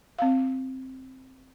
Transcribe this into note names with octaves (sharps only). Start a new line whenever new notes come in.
C4 F5